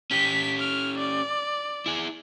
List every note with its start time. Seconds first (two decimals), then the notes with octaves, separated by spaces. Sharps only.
0.11 C#4 G4 B6
0.60 F6
0.98 D5
1.86 E4 G#4